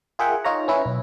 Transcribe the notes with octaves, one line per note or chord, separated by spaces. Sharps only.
F4 G#4 A#4 E5 F#5 G5
D#4 F4 C#5 A#5
C#4 E4 B4
B1